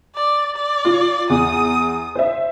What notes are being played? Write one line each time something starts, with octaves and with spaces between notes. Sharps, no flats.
D5
D5
F4
E2 D#6
C5 E5